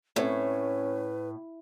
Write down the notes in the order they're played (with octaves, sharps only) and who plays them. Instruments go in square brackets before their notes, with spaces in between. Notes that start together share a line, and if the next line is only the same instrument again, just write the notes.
[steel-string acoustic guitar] A2 [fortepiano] A3 C4 C#5 [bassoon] C#4 [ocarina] B4